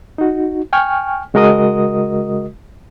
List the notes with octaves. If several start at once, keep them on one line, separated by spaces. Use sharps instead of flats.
D#4 F#4
G5 G#5 C#6 F6
C#3 G#3 F#4 A#4 D#5 D#6